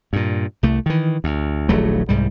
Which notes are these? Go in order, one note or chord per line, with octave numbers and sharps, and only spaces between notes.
G2 A#2
C2 A3
D#3 E3
D2
D#1 A#1 F#3 A3
C2 G#2 G3